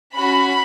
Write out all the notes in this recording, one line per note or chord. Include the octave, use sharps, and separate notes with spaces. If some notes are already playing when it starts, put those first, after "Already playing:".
C#4 F#4 B5